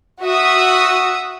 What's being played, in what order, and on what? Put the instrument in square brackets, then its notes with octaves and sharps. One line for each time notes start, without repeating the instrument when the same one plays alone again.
[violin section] F#4 E5 D#6